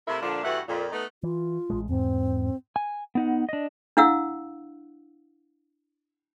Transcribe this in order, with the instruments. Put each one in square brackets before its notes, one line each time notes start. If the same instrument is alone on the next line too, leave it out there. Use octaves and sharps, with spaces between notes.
[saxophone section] C3 A3 A#3 E4
A#2 D3 F3 D4
G2 E3 A3 F#4 F#5
F2 A#2
A3 B3 D#4
[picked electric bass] E3 [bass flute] F4
[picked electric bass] A1 G#3
[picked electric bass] E2 G#2 [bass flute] C4
[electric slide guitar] G#5
B3 D#4 F#5
D4 D#5
[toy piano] D4 E4 F5 F#5 E6